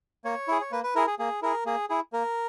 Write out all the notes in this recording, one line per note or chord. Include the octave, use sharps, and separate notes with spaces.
A#3 C#5
E4 G#4
C#5
A#3 B4
B4
E4 G#4 A#4
G#4
A#3 G#4
E4 G#4 A#4
A#3 G#4
E4 G#4
A#3 A#4